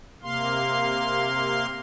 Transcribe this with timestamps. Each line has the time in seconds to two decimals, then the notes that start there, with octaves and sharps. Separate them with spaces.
0.22 C3 A#3 F5 C6